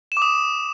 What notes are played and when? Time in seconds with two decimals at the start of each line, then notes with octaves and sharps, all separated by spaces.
0.12 E7
0.17 D6
0.22 D#6